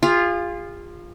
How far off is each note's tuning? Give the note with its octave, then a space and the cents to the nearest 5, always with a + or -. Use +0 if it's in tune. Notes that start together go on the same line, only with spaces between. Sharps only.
F4 +0 G#4 -40